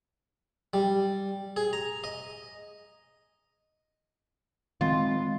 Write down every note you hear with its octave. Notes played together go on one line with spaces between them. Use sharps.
G3
G#4
A#5
D#5
D#3 G#3 C4 F4